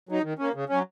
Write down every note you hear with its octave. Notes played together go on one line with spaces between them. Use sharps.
F#3 D#4
D#3
A#3 C#4
C#3
F#3 C#4